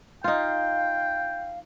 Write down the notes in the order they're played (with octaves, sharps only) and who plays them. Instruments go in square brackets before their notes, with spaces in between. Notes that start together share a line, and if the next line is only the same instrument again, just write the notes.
[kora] D#4 F4 [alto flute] F5 [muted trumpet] G5